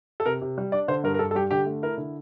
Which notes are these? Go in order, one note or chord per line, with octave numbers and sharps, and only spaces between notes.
A4
C3 A#4
C3
G3
D4 D5
D3 C5
G2 A#4
A#4
G2 A4
A4
G3 G4
D3 G4
A3
E4 A#4
D3